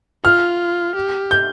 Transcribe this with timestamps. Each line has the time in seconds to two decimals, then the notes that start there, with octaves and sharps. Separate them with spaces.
0.24 F4 F6
0.95 G4
1.31 G6